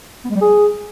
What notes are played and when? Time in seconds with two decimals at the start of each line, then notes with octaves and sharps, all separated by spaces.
0.25 B3
0.30 G#3
0.36 G3
0.41 G#4